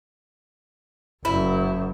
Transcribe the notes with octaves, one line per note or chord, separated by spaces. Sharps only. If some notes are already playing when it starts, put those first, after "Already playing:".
F#1 F#2 E4